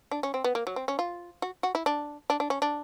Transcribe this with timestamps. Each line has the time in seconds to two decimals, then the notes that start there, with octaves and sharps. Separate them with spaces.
0.11 D4
0.23 C#4
0.34 C4
0.44 B3
0.55 A#3
0.67 F#3
0.76 C4
0.88 C#4
0.99 F4
1.42 F#4
1.63 F#4
1.75 E4
1.86 D4
2.30 D4
2.40 D4
2.50 C#4
2.62 D4